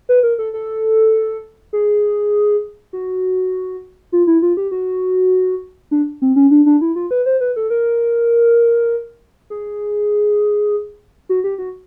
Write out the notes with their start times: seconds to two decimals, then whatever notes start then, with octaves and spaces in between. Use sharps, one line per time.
0.09 B4
0.23 A#4
0.39 A4
0.54 A4
1.73 G#4
2.93 F#4
4.12 F4
4.27 E4
4.42 F4
4.57 G4
4.71 F#4
5.91 D4
6.22 C4
6.36 C#4
6.51 D4
6.66 D4
6.81 E4
6.96 F4
7.11 B4
7.26 C5
7.41 B4
7.56 A4
7.70 A#4
9.50 G#4
11.29 F#4
11.44 G4
11.58 F#4